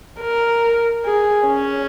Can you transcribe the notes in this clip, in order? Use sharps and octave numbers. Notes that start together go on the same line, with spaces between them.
A#4
G#4
C#4